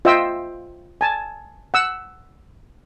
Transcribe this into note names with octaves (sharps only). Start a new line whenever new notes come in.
F4 C5 D#5 E5 G5 E6
G#5 A5
F#5 E6